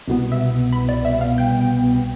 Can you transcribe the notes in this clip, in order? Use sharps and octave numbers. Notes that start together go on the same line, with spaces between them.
C2 B2 B3
E5
B5
D5
E5
F5
G5